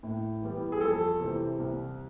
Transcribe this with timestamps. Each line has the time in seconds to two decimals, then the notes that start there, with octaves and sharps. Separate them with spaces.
0.03 A2
0.42 E3 G3 B3
0.72 G#4
0.81 F2 A4
1.20 C3 E3 G3 C4
1.59 C2